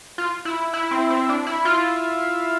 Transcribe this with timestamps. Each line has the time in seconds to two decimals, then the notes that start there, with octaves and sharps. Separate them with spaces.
0.18 F4
0.45 E4
0.74 E4
0.91 C4
1.10 C4
1.29 D4
1.47 E4
1.65 F4